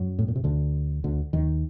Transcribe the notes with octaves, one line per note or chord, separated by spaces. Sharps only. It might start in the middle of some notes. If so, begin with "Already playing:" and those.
Already playing: F#2 F#3
A2
A#2
C3
D2 D3
D2 D3
D#2 D#3